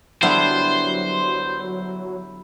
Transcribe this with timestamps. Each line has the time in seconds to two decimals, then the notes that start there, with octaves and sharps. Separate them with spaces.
0.23 D3 F#3 G3 B3 E4 C5